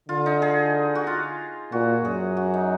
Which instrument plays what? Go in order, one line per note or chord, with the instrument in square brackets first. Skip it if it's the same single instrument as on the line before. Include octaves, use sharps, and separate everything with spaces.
[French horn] D3 [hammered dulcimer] F4
[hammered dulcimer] D#4
G#4
F#4
F4
[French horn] A#2 [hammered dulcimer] F#4
[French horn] F#2 [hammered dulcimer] G#4
[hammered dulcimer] F#4
D#4